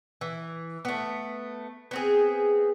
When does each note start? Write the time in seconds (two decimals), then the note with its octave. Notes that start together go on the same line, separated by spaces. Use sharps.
0.21 E3
0.85 A3 B3
1.91 B3 C4 G#4